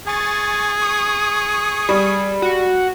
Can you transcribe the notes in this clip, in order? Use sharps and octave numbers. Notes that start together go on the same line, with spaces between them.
G#4 G#5 C#6 A6
C#6 D#6
G3
F#4